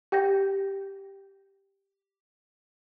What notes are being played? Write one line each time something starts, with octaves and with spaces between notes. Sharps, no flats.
G4 G5 G6 A#6